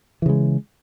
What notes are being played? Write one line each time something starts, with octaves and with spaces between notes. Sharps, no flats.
C#3 E3 G#3